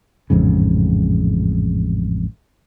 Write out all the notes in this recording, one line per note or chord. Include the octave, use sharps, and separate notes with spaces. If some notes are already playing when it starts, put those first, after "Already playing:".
A1 F2 G#2 C#3